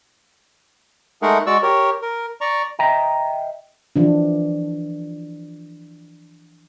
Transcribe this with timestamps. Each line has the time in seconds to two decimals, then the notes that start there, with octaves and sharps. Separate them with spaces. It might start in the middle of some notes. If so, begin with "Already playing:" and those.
1.22 G#3 A3 D#4 G#4 A#4 F#5
1.46 G#3 F#4 D5 C#6 E6
1.63 G4 A#4 C#5
2.02 A#4
2.41 D5 A#5 C#6
2.79 D#5 E5 G5 A#5
3.96 E3 F3 D4